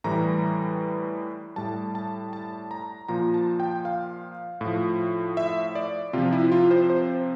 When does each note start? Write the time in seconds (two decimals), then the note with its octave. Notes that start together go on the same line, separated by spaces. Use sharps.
0.04 A2 E3 G3 A#5
1.56 A2 G3 A5
1.95 A5
2.33 A5
2.71 A#5
3.08 A#2 F3 A#5
3.34 A5
3.60 G5
3.85 F5
4.61 A2 F3
5.37 E5
5.75 D5
6.13 C3 F3 F4
6.33 E4
6.52 F4
6.71 C5
6.90 C5